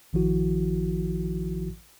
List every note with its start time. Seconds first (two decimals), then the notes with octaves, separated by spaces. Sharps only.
0.13 A1 D#3 F3 E4 F#4